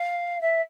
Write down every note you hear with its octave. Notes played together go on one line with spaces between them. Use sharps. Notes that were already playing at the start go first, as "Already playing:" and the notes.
Already playing: F5
E5